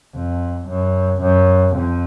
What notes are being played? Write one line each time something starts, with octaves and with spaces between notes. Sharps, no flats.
F2
F#2
F#2
F2